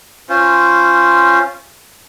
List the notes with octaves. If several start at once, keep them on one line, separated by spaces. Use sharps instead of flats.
C#4 F4 C5